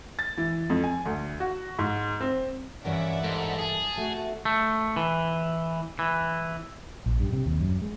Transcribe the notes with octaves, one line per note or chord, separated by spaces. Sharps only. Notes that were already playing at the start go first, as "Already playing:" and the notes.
A6
E3
F2
G#5
D2
F#4
G#2
C4
G2 E3 C#4 A#4 D5 E5 F#5
G#2 A4
G#4 A5
A3 F#4
A3
E3
E3
A#1
G2
C3
D#2
F#2
G#3